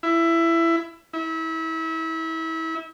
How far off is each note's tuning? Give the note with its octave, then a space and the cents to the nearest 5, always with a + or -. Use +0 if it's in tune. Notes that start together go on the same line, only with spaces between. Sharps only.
E4 +15
E4 -30